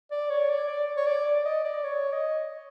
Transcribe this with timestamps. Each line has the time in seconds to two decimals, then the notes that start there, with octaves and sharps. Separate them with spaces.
0.11 D5
0.30 C#5
0.49 D5
0.67 D5
0.97 C#5
1.06 D5
1.25 D5
1.45 D#5
1.64 D5
1.84 C#5
2.12 D#5